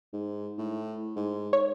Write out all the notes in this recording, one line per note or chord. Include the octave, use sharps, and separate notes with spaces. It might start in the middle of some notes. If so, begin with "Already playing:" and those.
G#2
A2
G#2
C#5